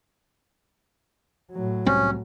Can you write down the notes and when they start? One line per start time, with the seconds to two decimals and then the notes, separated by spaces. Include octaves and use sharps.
1.52 A2 F#3
1.86 C2 G3 C4 C#4